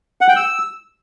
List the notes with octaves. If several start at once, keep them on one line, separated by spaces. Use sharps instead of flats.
F#5
G5
E6